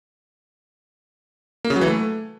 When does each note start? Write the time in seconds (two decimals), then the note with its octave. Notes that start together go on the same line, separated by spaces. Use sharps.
1.65 A#3
1.70 C#3
1.76 F#3
1.81 E3
1.87 A3